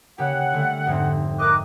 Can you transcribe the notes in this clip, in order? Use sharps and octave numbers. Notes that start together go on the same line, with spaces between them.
C#3 A#3 G4 F#5
D3 G3 A3
F1 G#2 C4
A#4 D#5 D6 F#6